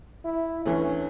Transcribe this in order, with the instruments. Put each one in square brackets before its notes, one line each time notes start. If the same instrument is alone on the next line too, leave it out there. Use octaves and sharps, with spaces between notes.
[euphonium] E4
[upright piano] D2 E3 [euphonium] C#4